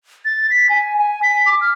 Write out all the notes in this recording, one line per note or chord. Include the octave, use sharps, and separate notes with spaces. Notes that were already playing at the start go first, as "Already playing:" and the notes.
A6
B6
G#5
G#5
B6
D6
F6